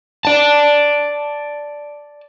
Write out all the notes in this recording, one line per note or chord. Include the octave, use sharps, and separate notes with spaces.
D5 A5